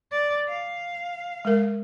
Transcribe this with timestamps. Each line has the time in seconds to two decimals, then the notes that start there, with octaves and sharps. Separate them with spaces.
0.11 D5
0.49 F5
1.45 G#3 A#4